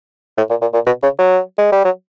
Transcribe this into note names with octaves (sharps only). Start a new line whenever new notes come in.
A2
A#2
A#2
A#2
B2
C#3
F#3
G#3
G3
F#3